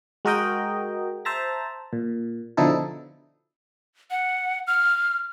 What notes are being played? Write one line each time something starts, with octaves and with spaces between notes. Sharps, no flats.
G#3 F#4 A#4 D#5 G5
C5 E5 A5 A#5 A#6
A#2
B2 D3 F3 D#4 E4 A4
F#5
F6